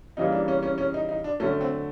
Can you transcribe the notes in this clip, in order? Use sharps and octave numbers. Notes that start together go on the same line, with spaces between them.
C#3 E3 G3 A#3 D#4
D4
C#4
C#4
C#4
D#4
D#4
D4
D3 F#3 A3 C#4
C4